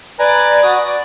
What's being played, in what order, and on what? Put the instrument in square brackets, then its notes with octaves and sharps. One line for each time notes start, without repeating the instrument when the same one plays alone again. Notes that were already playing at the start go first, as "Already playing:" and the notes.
[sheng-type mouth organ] B4 G#5 A#5 [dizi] D5
[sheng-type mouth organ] F#4 D#6
D5